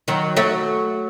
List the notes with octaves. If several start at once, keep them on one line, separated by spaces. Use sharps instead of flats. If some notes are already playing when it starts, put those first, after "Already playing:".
D#3 F#3
F#3 A3